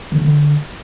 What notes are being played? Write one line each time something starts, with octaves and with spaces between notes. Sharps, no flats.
D3
C#3
D3